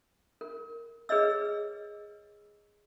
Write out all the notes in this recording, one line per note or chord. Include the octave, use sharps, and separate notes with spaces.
A#4
G#4 B4 C#5 D#5 E6